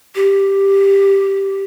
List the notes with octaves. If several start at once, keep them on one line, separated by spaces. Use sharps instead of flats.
G4